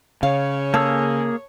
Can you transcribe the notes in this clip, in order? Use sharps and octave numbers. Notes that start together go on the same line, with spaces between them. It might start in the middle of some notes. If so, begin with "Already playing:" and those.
C#3 C#5 F5
A#3 G#4 A4 E6